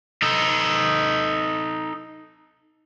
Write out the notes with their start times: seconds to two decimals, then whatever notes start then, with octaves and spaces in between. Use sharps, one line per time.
0.22 D#4 A4